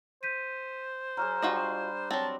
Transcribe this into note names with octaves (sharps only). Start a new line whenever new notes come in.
C5 G6 B6 D#7
F#3 F#4 G#4 A#5 F6
G3 D4 F4 F#4 D#5
F#3 C4 A5